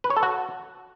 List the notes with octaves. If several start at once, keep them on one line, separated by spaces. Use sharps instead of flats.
B4
C#5
A4
F#4